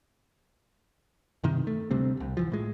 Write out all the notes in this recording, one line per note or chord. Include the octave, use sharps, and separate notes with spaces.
G2 C3 D#3
A3
D2 C3 G3 C4
E1 C2
G#1 E3 F3
A2 G#3